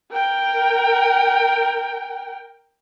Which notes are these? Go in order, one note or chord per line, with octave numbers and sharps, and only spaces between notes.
A#4 G5